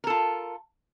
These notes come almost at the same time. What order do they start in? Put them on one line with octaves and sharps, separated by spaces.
A#4 A4 F4